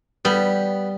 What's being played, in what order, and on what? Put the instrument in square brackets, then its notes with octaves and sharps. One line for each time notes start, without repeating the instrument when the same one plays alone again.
[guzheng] G3 [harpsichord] B3